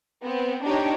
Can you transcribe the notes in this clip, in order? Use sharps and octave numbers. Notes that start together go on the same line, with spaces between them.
B3 C4
D4 D#4 G4 C#5